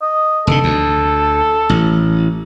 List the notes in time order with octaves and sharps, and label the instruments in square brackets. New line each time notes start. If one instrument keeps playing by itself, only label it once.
[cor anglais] D#5
[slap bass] F1 D3 [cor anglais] A4
[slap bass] D2
A1